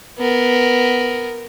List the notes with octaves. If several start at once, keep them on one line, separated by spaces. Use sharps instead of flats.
B3 A#4